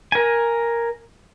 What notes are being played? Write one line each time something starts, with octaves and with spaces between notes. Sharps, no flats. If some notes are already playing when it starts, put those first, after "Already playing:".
A#4 G#5